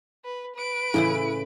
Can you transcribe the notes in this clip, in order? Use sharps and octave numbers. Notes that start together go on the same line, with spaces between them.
B4
B4 D7
A2 C#3 E3 E4